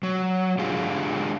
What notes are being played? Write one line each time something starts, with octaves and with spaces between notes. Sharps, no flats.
F#3
D3 G#3 F4 G4 G#4